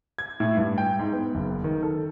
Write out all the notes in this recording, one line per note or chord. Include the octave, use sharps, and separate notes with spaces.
G#6
A2
G2
G5
G#2
B3
F#1
D#3
A4